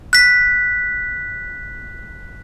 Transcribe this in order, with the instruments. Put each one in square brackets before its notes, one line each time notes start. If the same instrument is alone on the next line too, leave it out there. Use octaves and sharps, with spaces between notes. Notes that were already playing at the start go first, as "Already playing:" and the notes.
[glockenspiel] F#6 B6